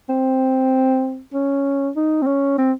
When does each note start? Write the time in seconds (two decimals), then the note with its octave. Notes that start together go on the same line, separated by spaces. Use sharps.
0.10 C4
1.34 C#4
1.96 D#4
2.22 C4
2.27 C#4
2.58 C4